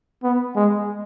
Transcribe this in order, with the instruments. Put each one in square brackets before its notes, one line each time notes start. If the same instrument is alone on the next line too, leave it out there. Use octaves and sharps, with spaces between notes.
[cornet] B3
G#3